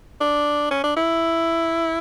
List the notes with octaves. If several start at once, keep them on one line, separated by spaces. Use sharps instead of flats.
D4
C#4
D4
E4